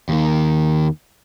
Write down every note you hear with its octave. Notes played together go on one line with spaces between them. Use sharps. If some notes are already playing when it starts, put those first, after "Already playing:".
D#2 D#3